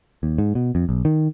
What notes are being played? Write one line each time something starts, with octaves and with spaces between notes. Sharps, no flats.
D#2
G#2
B2
F2
B1
D#3